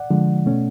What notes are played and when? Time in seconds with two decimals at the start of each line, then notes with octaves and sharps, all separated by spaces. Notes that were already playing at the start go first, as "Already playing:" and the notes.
Already playing: D5 F#5
0.10 D3 F3 G#3
0.46 B2 A3 C#4